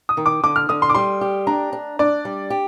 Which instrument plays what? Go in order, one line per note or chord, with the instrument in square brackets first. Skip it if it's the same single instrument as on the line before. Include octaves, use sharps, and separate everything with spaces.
[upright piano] D#6
[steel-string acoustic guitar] D#3
[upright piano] D6
[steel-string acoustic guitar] D3 [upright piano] D6
[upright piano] F6
[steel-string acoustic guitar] D3 [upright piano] D#6
[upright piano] C6
D6
[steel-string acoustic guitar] G3 [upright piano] C6
[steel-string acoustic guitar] G4
[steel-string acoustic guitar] D4 [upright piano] A#5
[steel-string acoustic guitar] D4
[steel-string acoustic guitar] D4 [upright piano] D5
[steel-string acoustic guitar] G3
G4